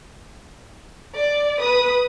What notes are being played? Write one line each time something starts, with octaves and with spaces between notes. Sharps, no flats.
D5
B4 D#6